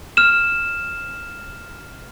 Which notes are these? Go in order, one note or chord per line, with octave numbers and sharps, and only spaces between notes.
F6 E7